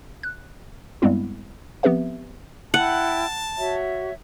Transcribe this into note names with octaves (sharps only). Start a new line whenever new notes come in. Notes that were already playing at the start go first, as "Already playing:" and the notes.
F#6
G2 G3 G#3 B3 C4 E4
F3 B3 C4 G4 B4 E5
E4 F#5 G5 A5
F#4 C#5 E5